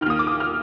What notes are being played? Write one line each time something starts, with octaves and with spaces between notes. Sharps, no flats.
D#2 D#3 D#6 F6
D6
D#6
F6